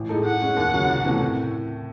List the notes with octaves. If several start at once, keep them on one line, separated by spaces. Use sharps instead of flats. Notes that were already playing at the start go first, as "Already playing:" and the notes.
Already playing: A1
A2 G#3 D#4 A4
A2 F#5
G#3 C#4
D#2
C#3 F#3 C#4
C2
C3 E3 A3 C#4
A2